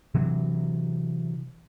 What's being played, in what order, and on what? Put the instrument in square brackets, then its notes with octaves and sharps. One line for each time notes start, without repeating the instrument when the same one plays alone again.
[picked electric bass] C3 E3 F#3